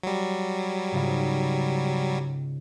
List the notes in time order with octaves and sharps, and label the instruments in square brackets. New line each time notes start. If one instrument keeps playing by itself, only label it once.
[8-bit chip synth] F#3 G3
[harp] G#2 C#3 F4